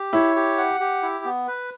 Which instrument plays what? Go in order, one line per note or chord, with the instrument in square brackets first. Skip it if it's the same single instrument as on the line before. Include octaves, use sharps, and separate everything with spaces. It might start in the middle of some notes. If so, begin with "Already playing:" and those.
Already playing: [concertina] G4
[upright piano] E4 [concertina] C#5
[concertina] G4
F#5
G4
E4
B3
B4